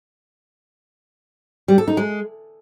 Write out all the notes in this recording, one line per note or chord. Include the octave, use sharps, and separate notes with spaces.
G3
A4
D#4
G#3